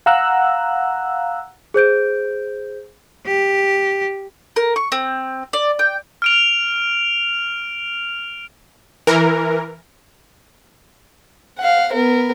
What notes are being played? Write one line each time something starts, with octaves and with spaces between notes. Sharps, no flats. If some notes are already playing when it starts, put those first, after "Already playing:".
F5 F#5 A#5 E6 F#6
G#4 C5 G6 D7
G4
A#4
C#6
C4
D5
G5
F6 D7 F7
E3 A#4
F5 F#5
B3 A#4